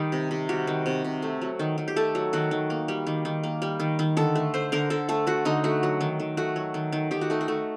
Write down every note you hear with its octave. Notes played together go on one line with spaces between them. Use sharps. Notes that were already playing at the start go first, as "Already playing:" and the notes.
Already playing: D#3 G3 D#4
C3
C3
G3 F#4
D#3
C3
C3
A3
F#3
D#3
D#3
G4
A3 A4
F#3
D#3 F#4
D#3
A#3
G3
D#3
D#3
A#3
G3
D#3
D#3
D3 A4
A3
A3 C5
D3 A#4
D3 A4
A3 A4
A3 F#4
D3 D#4
A3 F#4
F#3
D#3
D#3
A3 F#4
F#3
D#3
D#3
D#3 G4
F#4
A3 D#4
F#4
A3